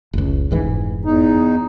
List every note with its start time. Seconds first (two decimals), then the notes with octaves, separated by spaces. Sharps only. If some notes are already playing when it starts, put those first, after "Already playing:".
0.13 F1 C#2
0.51 F1 G#2 E3
1.05 E2 D#4